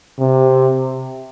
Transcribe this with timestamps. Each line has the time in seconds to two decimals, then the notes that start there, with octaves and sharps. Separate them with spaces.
0.19 C3